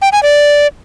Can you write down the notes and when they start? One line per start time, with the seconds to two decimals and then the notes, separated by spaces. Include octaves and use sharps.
0.02 G5
0.12 G#5
0.23 D5